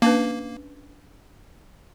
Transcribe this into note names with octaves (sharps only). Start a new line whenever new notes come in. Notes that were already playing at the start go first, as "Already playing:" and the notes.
A#3 C#4 D4 B4